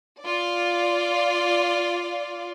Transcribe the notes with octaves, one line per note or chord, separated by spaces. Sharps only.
F4 D5